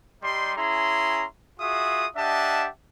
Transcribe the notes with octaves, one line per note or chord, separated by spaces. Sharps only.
G3 D#4 C6
C#4 E4 G#4 A#5 C6
F4 F#4 G#4 E5 D#6
D4 G4 D#5 E5 F#5 A5